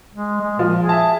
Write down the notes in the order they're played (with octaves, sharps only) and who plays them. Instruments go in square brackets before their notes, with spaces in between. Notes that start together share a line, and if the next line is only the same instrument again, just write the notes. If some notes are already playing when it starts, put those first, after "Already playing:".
[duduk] G#3
G#3
[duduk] A#2 [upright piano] F3
[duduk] G#4
[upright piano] E5 A5